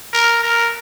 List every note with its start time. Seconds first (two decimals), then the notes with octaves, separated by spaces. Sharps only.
0.13 A#4
0.43 A#4